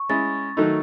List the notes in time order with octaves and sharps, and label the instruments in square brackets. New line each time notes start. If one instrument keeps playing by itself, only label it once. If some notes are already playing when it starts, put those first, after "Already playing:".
Already playing: [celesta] C#6
[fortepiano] G#3 C#4 E4 [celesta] A6
[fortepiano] D#3 F#3 A3 D#4 A4